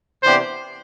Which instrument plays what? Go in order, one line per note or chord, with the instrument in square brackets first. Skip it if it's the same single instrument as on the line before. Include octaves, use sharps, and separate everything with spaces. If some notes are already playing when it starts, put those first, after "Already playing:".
[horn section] C3 E3 B3 D4 G4 [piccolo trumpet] C5